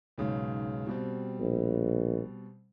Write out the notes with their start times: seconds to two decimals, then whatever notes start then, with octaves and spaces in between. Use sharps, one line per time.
0.18 B1 G#2 C#3
0.87 B2 G3 C4
1.40 A#1